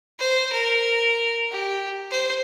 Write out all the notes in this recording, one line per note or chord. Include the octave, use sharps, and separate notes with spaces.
C5
A#4
G4
C5